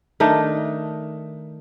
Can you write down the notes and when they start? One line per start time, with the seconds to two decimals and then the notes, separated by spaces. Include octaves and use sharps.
0.20 D#3 A3 D4 D#4